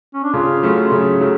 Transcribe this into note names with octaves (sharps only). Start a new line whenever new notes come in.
C#4
D4
C#3 F4
F#3 A3 C#4
C#3
F#3 A3